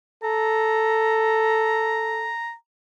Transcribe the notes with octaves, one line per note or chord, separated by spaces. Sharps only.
A4 A#5